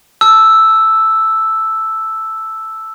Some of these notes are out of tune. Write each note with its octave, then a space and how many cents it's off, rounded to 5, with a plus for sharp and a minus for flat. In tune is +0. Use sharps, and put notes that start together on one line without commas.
A5 +0 E6 +0